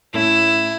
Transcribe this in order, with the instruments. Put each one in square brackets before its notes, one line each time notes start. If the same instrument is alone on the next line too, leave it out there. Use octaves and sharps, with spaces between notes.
[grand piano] A2 A3 C#4 [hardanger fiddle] E4